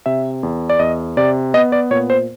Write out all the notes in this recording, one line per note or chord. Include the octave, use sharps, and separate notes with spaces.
C3 E5
E2
D5
E2 D#5
C3 D5
B3 D#5
D5
A#2 C#5
C5